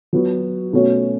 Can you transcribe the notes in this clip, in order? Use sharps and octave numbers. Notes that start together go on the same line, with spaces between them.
F#3 B3 F#4
B2 A3 C#4 F#4 C#5